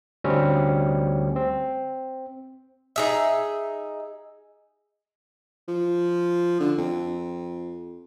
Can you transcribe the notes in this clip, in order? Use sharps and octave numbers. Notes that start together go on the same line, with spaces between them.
D2 G3 C4 C#4
C4
D#4 G#4 E5
F3
D3
F2